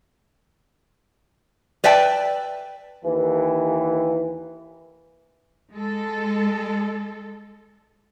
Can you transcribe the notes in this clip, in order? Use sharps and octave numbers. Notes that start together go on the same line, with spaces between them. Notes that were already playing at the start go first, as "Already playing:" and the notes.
B4 D5 E5 G5 A5
D#2 E3
G#3 A4